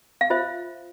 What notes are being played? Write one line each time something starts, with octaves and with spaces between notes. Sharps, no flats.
F5
F4 C5 E5